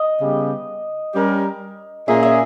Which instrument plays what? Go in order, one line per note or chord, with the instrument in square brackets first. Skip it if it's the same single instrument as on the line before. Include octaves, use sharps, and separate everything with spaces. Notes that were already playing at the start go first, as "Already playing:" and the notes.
Already playing: [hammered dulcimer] D#5
[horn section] C#3 G3 B3 G4
G3 C#4 G4 A#4
[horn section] A#2 A#3 C#4 G#4 [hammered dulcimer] E5
[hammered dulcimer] E5